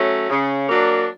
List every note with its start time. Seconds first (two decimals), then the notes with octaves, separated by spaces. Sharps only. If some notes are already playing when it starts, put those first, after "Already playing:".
Already playing: F#3 A3 C#4
0.29 C#3
0.68 F#3 A#3 D4